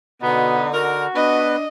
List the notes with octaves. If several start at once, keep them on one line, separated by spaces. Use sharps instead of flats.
B2 D3 B3 D#4
F#4 A#4
B3 D4 B4 D#5